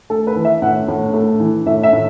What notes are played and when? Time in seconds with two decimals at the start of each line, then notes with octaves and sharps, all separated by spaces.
0.10 A3 A4
0.27 B4
0.36 E3
0.45 E5
0.62 A2 F#5
0.88 A2
1.14 A3
1.40 E3
1.66 A2 E5
1.83 E5
1.93 A2